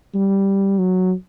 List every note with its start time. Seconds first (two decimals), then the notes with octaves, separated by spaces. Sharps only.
0.14 G3
0.78 F#3